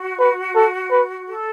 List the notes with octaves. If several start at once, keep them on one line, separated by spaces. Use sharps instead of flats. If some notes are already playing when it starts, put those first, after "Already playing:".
Already playing: F#4
B4
A4
B4
A4